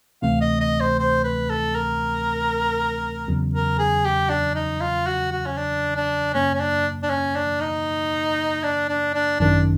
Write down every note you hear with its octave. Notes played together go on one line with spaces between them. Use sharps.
D2 C3 E3 A3 C4 F5
D#5
D#5
C5
C5
B4
A4
A#4
E2 C#3 F#3
A#4
G#4
G4
D4
D#4
F4
F#4
F#4
C#4
D4
D4
F#2 C#3 F#3 A#3 C#4
C#4
D4
D4
C#4
D4
D#4
D4
D4
D4
G#1 F#2 D#3 D4